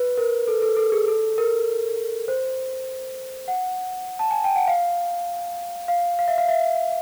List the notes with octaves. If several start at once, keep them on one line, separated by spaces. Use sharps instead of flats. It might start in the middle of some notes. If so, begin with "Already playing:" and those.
Already playing: B4
A#4
A4
A4
A4
G#4
A4
A#4
C5
F#5
A5
G#5
G5
F#5
F5
F5
F5
E5
F5
E5